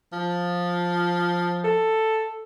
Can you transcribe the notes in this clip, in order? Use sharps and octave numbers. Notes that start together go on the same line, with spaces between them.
F3
A4